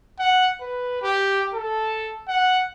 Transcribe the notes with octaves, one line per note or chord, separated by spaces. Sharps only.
F#5
B4
G4
A4
F#5